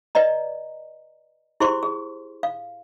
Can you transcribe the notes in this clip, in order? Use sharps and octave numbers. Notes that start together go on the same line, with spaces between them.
B4 D5 D#5 A#5
E4 G4 G#4 C5 C6 C#6
G#4
F5